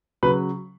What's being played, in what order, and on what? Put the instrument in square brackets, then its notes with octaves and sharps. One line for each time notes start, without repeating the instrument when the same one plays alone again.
[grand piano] C#3 F#3 B4